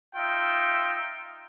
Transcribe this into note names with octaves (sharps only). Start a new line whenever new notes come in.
D#4 F4 E5 G5